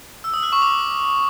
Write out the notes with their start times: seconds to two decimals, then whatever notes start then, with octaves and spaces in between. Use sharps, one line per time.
0.24 E6
0.34 D#6
0.43 F6
0.53 C#6
0.62 D6